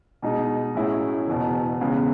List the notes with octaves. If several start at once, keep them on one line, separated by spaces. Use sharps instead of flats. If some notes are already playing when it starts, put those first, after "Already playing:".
B2 G#3 D#4
A2 F#3 C#4 E4 G#4
F#1 E2 B2
E2 C#3 G#3 B3